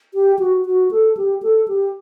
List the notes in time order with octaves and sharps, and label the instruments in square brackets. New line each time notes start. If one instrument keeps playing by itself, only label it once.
[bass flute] G4
F#4
F#4
A4
G4
A4
G4